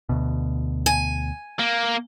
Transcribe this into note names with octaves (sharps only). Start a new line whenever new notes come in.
D2 B2
G#5
A#3